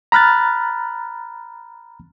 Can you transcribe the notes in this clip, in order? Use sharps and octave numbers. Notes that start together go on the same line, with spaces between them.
A#5 B5 F6 F#6 A6